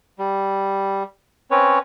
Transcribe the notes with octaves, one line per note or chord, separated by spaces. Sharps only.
G3
C4 C#4 B4 C#5